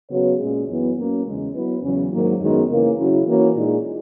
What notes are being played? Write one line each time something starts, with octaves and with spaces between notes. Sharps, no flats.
C#3 F#3 B3 F#4 C#5
A#2 G#3 C#4 G#4
F#2 E3 B3
F#3 A#3 C#4
E2 C#3 G#3
F#3 B3 E4 B4
E2 C#3 F#3 C#4
G#2 D#3 F#3 A#3
F#2 D#3 G#3 B3
C#3 E3 A#3
C#3 F#3 C#4 E4
E3 A#3 C#4 F#4 C#5
A#2 G#3 D#4 G#4